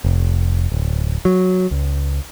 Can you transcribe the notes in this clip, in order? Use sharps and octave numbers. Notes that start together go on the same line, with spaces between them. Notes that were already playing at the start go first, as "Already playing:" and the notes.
F1
D1
F#3
C#2